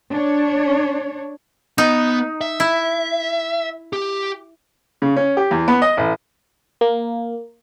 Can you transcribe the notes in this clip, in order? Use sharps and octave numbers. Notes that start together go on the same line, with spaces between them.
D4 C#5
B3 D#4
E5
E4
G4
C#3
C#4
G4
E2
B3
D#5
A1
A#3